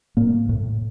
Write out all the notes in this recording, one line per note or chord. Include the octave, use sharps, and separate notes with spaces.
A2 A#3
A2